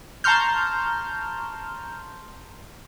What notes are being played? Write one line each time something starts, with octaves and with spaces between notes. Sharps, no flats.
A5 A#5 C6 C#6 F6 G6